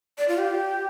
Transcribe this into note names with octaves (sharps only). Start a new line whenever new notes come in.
D5
F4
G4